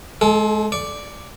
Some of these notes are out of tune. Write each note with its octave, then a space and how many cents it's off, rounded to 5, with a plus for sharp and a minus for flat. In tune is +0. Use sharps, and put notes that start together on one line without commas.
G#3 +30 A4 -20
D5 +0 C#6 +30